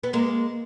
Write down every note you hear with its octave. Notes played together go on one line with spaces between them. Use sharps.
B3
G#3 A#3